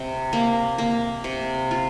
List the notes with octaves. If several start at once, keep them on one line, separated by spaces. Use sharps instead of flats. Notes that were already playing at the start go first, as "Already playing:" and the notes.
Already playing: C3
A#3
A#3
C3
F4